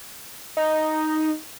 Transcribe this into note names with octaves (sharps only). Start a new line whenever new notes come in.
D#4